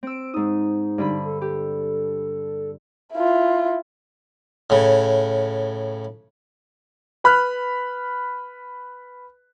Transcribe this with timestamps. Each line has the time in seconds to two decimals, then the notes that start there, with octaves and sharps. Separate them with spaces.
0.03 C4 E6 D7
0.34 G#2 D#4 D#6
0.98 G2 D3 B5
1.24 A4
1.41 G4 A4
3.14 E4 F4
4.70 A2 C#3
7.24 B4 B5 F6 F#6